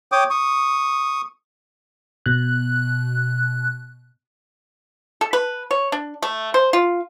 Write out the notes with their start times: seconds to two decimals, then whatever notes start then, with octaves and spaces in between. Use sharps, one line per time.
0.12 C#5 G5 D6 D#6
0.30 C#6 D#6
2.26 B2 F#6
5.21 A4
5.33 B4
5.71 C#5
5.92 D4
6.22 A3
6.54 C5
6.73 F4